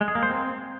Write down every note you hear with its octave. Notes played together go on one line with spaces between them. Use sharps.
G#3
G#4
A#3
C5
C4